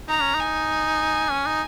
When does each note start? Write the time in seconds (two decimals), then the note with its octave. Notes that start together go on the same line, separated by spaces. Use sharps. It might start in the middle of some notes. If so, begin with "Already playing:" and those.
0.08 D#4 A#5
0.22 C#4
0.34 D#4 G#5
1.31 C#4
1.46 D#4